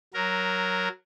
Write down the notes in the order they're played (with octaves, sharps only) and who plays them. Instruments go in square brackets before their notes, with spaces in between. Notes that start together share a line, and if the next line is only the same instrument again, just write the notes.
[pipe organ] F#3 A#4